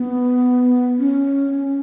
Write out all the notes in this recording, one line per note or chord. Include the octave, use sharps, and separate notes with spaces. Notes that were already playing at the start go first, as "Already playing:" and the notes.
Already playing: B3
C#4